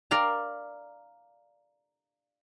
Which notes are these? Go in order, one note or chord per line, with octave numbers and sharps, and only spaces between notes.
A#4 D5 F5 A#5